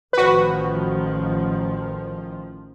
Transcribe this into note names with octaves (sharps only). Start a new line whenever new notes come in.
A1 D#3 F3 F#4 B4